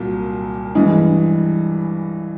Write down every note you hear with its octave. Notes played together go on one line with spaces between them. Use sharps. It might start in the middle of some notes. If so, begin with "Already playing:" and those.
Already playing: C2 A#2 F#3 A#3
G2 E3 G#3